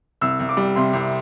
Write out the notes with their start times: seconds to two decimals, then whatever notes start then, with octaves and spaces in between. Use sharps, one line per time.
0.21 C2 E6
0.40 C2
0.49 D6
0.57 G3
0.75 C3 C6
0.93 C2